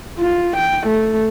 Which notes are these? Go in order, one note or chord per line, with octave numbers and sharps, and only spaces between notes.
F4
G5
A3